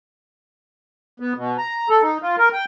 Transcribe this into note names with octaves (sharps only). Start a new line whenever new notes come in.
B3
B2
A#5
A4
D#4
F4
A#4
G5